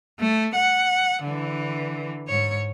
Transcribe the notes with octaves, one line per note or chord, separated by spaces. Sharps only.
A3
F#5
D3 E3
G#2 C#5